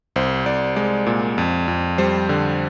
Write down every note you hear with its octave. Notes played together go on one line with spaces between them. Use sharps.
C2 C5
C2 D5
G#3 D5
A#2
F2
F2
G3 C5
D3